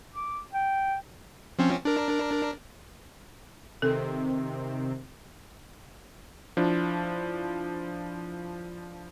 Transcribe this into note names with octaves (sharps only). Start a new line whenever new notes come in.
D6
G5
F3 C4 C#4
D4 A#4
C3 D#3 C4 A4
F3 D4 E4